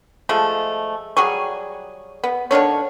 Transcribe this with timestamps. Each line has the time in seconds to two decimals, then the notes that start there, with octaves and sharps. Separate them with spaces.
0.29 F3 G#3 A3
1.17 F#3 G3 G#4 C#6
2.24 B3
2.51 D3 D#3 D4 C#5